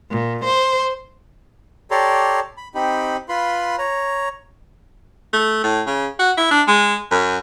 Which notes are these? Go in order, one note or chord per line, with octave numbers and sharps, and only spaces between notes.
A#2
C5
G4 A4 C#5 D5 A#5 C6
B5
C4 D#4 G4 B5
F4 B4 B5 C6
C#5 A#5
A3
A2
C#3
F#4
E4
D4
G#3
F#2